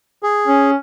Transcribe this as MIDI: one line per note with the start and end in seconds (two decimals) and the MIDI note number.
0.23 0.71 68
0.47 0.76 61